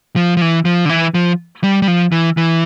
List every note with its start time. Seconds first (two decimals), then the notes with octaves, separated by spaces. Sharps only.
0.16 F3
0.37 F3
0.42 E3
0.65 F3
0.85 D3
0.89 E3
1.14 F3
1.64 G3
1.82 G3
1.88 F3
2.12 E3
2.37 E3